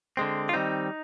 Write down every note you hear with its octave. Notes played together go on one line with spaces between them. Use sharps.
D3 G#3 C4
F4
D#3 G3 C4 D#4